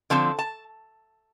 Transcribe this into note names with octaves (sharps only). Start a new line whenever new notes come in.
D3 F3 C4 A5
A5